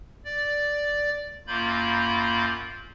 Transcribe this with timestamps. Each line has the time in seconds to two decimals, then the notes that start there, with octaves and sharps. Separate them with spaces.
0.25 D5
1.47 F#2 A#3 F4 B5 G6